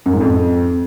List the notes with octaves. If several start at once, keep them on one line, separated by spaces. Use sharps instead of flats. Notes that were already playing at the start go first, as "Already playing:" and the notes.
F#2
G#2
F2